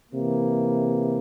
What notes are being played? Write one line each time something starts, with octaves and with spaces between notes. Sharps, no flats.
C3 E3 A#3